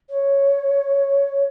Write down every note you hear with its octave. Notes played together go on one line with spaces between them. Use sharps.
C#5